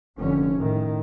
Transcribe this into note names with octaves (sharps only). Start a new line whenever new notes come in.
F1 D3 C#4
A2 D#3